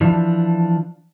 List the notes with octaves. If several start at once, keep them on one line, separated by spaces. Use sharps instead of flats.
E3 F3 D4